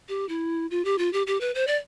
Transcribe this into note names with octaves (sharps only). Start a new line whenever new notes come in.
G4
E4
F4
G4
F4
G4
G4
B4
C5
D5